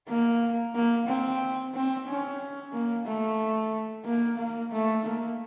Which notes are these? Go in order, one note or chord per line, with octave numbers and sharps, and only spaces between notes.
A#3
A#3
C4
C4
C#4
A#3
A3
A#3
A#3
A3
A#3